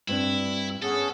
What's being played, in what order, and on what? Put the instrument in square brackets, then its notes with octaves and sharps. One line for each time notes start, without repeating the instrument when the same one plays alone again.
[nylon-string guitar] G2 C4 D4 [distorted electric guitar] E4
[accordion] B3 C#4 G#4 [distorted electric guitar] A4